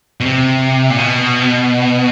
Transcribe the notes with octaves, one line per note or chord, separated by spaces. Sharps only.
B2
C3
A#2
B2